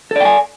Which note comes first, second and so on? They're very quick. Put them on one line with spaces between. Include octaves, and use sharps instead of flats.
A4 D5 G5 G#5